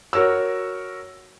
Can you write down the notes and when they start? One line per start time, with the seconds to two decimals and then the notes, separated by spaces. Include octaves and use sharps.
0.13 F#4 A#4 C#5 E6